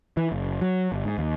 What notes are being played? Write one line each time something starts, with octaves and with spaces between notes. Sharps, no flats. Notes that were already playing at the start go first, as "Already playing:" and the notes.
E3
F#1
F#3
G1
G#2
D#2